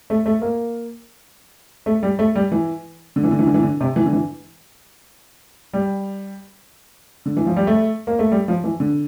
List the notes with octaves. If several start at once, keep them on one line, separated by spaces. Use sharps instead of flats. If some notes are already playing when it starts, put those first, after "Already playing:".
A3
A3
A#3
A3
G3
A3
G3
E3
D3
E3
D3
E3
D3
E3
D3
C3
E3
D3
E3
G3
D3
E3
F3
G3
A3
A#3
A3
G3
F3
E3
D3